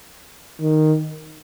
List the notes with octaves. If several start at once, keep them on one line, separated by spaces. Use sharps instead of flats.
D#3